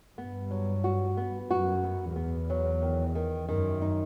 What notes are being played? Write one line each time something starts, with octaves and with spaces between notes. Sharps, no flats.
G2 B3
F#3
F#4
B3
F#2 F#4
B3
E2 B3
F#3
D#3
D#3
F#2 D#3
D#4